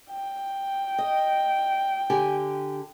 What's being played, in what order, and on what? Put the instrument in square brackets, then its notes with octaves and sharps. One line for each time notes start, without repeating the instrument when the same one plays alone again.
[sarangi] G5
[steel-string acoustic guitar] D#5
D3 G4 G#5